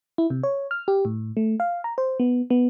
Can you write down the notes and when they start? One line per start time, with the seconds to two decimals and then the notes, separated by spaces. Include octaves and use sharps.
0.18 E4
0.30 C3
0.43 C#5
0.71 F6
0.88 G4
1.05 A2
1.37 A3
1.60 F5
1.84 A#5
1.98 C5
2.20 B3
2.50 B3